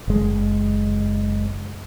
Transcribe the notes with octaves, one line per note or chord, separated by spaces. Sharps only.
F#1 G#3